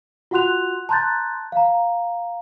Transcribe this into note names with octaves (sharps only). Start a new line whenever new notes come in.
F4 F#4 F#5 C6 F#6 F7
A5 A#5 C6 F#6 G6 A6
F5 A#5